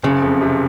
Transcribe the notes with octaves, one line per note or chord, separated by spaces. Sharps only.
F#1 C#3
F2
C3